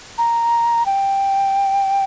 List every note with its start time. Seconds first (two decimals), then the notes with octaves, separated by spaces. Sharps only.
0.18 A#5
0.86 G5